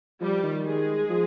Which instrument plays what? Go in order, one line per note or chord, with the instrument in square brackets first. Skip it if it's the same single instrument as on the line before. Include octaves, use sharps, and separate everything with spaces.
[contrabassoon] F3 [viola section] G3 G4
[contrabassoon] D#3
[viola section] G#3 G#4
[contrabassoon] F3